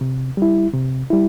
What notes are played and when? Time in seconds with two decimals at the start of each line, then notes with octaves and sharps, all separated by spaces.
0.01 C3
0.37 G3 E4
0.74 C3
1.10 G3 E4